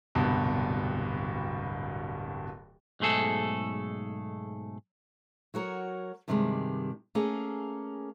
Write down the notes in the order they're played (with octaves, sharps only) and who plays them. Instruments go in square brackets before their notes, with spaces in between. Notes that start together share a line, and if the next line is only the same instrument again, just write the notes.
[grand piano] D1 C2 G2 B2
[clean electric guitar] B1 G#2 A3 G#4 A4
[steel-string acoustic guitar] F#3 F#4 A#4 C#5
G2 C3 D#3 F3 G3 G#3
A3 A#3 C#4 G#4 A#4